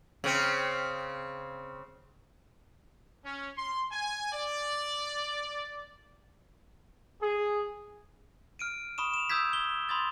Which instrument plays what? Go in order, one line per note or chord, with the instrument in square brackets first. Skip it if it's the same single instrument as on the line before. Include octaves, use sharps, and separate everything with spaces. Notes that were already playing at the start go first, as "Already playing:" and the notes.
[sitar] C#3 C4
[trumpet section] C#4
C6
G#5
D5
G#4
[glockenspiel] F6 D7 D#7
B5 C#6 D#6 E7
E7 F7
D#6 E6 G6 G#6 B6
G7
B5 C6 D#6 G#6 A6 G7